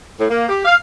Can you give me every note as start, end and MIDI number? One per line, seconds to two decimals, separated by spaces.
0.19 0.26 45
0.30 0.47 58
0.49 0.64 67
0.65 0.75 77